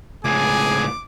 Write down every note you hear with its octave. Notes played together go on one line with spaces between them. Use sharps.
C#2 A2 G#4 G#5 D6